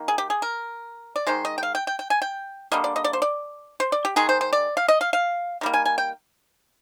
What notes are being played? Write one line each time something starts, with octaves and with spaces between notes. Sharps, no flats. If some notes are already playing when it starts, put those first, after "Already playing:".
Already playing: D#3 A#3
G#4
G4
G#4
A#4
D5
D#3 G#3 C5
D#5
G5
F5
G5
G5
G5
G#5
G5
D3 G3 A#3 D#5
D5
D#5
D5
C5
D5
C5
D5
G4
D#3 G#3 G#4
C5
C5
D5
F5
D#5
F5
F5
D#3 G3 A#3
G#5
G#5
G5